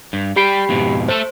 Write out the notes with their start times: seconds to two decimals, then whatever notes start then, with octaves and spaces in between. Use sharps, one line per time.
0.13 G2
0.36 G3 G4 G5 B5 C7
0.69 F2 G#2 B2
1.09 A3 A4 C5